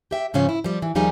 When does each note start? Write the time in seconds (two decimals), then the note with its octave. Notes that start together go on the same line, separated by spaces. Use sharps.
0.11 G4 E5 G5
0.34 G#2 C#3 F3 C#4 F4
0.49 E4
0.64 F3 G3
0.82 E3
0.95 D#2 F3 G3 D#4 G#4 G#5